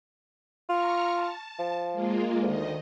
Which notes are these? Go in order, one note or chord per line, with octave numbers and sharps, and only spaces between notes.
F4 A#5 C#6 F6
A5
F3
G#3 A#3 F4
D2 D#3 D#5